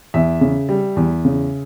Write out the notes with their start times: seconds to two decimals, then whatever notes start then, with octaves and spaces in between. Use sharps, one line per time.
0.14 E2 E5
0.41 C#3
0.69 G3
0.97 E2
1.25 C#3